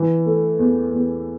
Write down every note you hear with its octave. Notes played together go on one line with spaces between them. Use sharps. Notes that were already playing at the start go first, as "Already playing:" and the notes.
Already playing: E3
A3
E2
E2